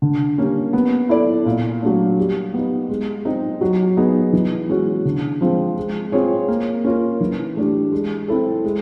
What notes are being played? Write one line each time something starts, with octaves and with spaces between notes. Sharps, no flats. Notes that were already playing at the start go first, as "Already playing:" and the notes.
D3
G3 A#3 C#4
B3
E4 A4 D5
A#2
F#3 A3 D4
G3
B3 D#4
G#3
C4 D#4
F#3
B3 D#4 G#4
E3
G#3 C#4 F#4
D3
F3 G#3 C4 F4
G#3
C4 F4 G#4 C#5
A#3
C#4 F4 A#4
E3
A3 D4 G4
G#3
C4 E4 A4
G#3